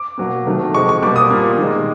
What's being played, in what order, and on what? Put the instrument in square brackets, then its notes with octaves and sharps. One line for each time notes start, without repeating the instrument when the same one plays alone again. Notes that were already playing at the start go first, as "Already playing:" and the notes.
Already playing: [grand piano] D6
B2 F#3 A#3
C3 D#3 F#3 A3
C3 F3 G#3 C#6
C#6
B2 G3 A#3 D6
D#6
A#2 G3 A#3
D#3 G#3